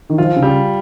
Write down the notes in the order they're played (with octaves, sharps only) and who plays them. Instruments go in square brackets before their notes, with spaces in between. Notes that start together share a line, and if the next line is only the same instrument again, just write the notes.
[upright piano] D#3
[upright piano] F3 [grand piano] F4
[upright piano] C#3
[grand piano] G3